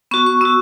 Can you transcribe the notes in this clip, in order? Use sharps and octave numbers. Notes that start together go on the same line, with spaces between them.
B3 F#4 C#6
C#6
B3 F#4 E6